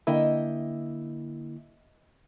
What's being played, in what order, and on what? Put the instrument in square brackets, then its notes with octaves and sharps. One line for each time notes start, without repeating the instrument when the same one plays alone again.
[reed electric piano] D3 A#3 E4 [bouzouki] D#5 E5 G5